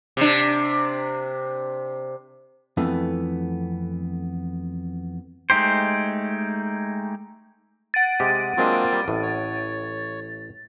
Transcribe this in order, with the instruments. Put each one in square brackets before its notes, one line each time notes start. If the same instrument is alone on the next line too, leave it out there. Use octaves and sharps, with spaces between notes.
[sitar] C3 D4
[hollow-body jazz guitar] F2 E3 A3 B3
[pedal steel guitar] G#3 A3 D#4 G4 C5
[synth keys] F#5 D7 D#7 [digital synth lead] A6
[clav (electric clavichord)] C3 G#3 G4
[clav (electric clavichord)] F#3 G#3 D4 [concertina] A#3 C4 F4
[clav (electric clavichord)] G3
A1 A2
[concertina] C#5